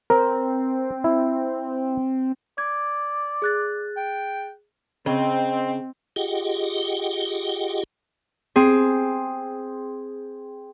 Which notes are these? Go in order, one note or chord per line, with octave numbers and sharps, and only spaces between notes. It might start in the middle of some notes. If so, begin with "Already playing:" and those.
C4 A#4
E4
D5 G#6
G#4 F#6 A6
G5
C#3 C4 D#5 G5
F4 G4 G#4 D#5 F#5 G5
C4 G#4